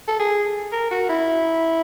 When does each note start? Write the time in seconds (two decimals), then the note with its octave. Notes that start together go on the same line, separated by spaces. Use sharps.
0.08 A4
0.19 G#4
0.72 A#4
0.91 F#4
1.09 E4